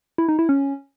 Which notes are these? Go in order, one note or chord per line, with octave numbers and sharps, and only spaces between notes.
E4
D#4
E4
C#4